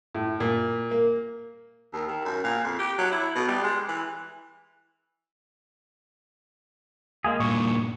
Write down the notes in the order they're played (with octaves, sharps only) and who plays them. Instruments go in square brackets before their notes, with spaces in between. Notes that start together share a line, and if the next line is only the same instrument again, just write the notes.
[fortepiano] A2
A#2
A#3
[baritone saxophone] D#2
D#3
F#2
A#2
F2
G4
F#3
E4
B2
G3
G#3
E3
[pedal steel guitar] G#3 A#3 G#4
[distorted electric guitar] G2 A#2 [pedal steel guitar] C#6